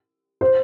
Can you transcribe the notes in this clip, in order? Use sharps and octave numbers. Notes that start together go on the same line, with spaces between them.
C5